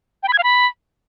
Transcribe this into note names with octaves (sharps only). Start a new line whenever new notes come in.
G5
B5
G#6
F5
B5